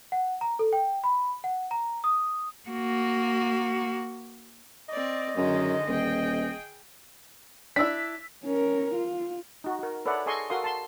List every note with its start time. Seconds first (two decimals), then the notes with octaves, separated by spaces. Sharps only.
0.12 F#5
0.41 A#5
0.59 A4
0.73 G5
1.04 B5
1.44 F#5
1.71 A#5
2.04 D#6
2.69 A#3 F#4
4.89 C4 D5 D#5
5.37 F#2 D3 D#3 G#3
5.88 D#1 G#4 G5
7.76 D4 E4 E6 B6
8.44 C#4 A#4
8.94 F4
9.64 D#4 F#4
9.79 F#4 A#4
10.05 A4 B4 C#5 D5 E5 F#5
10.26 G#4 A4 D#5 G#5 C6 C#6
10.50 F#4 A4 A#4 F5 C6 D#6
10.64 A5 C6